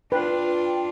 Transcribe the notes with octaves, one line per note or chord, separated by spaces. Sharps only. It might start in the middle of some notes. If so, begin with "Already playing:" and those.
D4 F4 B4 G5